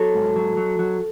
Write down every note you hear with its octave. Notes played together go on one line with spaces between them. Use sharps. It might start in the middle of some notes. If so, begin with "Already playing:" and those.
Already playing: F#3 A4
G#2
F#3
F#3
F#3